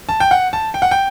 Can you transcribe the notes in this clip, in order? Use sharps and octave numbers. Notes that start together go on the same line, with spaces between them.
A5
G5
F#5
A5
G5
F#5
G5